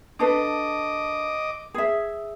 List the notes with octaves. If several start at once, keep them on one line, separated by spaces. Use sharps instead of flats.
D4 A4 B4 D#5 D6
G#4 E5